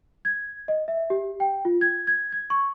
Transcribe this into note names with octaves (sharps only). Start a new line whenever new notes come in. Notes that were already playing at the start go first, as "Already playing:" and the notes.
G#6
D#5
E5
G4
G5
F4
G#6
G#6
G#6
C#6